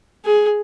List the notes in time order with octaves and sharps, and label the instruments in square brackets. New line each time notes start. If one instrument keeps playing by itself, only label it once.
[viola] G#4